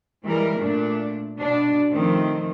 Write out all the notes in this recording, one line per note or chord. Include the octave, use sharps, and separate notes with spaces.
E3 G3 G#3 A#4
A#2 A3 D4
B2 D4
D#3 F3 A3 C4